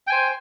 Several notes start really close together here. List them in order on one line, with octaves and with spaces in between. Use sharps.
G5 G#5 C5